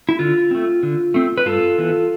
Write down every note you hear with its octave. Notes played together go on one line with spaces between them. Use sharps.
E4
D3 F4
A3 C4
D3
A3 C4
B4
G2 F4 A4
E3 B3